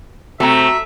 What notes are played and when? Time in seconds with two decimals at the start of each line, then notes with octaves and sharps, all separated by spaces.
0.40 C3 A3 C4 F#4 E5 A#5